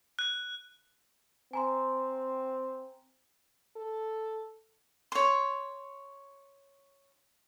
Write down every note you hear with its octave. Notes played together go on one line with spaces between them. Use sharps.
F#6
C4 G#5 A#5 C6
A4
C#5 C6